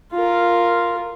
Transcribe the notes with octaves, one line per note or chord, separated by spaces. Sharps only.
F4 A#4